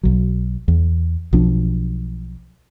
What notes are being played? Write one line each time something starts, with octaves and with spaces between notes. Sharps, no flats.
B1 F#3
E2
B1 F3 D4